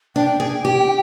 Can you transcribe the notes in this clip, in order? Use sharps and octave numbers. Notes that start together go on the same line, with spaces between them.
D4 G5
G#4
G4